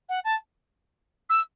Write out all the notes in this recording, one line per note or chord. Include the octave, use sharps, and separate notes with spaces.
F#5
A5
E6